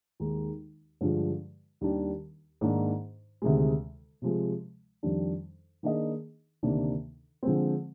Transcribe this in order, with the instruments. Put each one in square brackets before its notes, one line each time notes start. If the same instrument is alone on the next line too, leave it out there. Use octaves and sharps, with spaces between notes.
[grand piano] D#2 D#3 G#3 D#4
G2 D3 F3 G#3
D#2 D#3 G3 D4 G4
G#2 D#3 A#3 D4
D2 C3 D#3 G#3
C3 F3 G#3
F2 D#3 G3 D4
D#3 A#3 D4 G#4 D#5
D2 C3 D#3 A#3 D4
D3 F3 G#3 C4